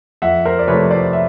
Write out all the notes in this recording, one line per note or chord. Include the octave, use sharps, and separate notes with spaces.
F2 E5 F#5
A#4 C5
D5
C3 F3 A3 B4 C#5
C5 D5
E5